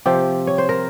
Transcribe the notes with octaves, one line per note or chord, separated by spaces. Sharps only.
C3 F3 G4
C#5
C5
A#4